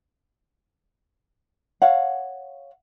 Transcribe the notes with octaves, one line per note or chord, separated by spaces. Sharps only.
C#5 F5 F#5